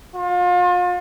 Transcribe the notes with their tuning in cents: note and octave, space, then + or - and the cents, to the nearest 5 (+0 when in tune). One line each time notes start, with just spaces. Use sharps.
F4 +35